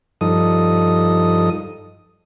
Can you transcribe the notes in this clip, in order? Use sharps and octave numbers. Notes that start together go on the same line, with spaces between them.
G2 F3 D#4 A4 D#6